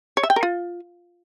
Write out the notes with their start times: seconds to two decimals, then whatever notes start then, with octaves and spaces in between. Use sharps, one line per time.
0.17 C#5
0.23 E5
0.30 G5
0.36 A#4
0.43 F4